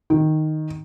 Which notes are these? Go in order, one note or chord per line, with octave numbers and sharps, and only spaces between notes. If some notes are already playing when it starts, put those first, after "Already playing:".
D#3